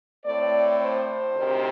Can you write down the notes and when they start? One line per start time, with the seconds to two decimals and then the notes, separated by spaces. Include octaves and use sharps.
0.25 A2 A3 C4 D5
0.79 C5
1.34 D2 C3 D#3